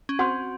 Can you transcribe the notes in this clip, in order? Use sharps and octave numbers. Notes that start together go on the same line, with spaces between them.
C#4
C4 F#4 C5 F#5 C6